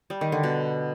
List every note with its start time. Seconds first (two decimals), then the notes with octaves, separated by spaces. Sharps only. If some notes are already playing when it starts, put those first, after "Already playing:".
0.10 G3
0.21 D#3
0.32 D3
0.43 B2